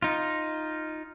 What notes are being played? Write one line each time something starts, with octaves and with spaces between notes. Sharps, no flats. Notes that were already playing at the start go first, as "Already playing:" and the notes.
D#4 F4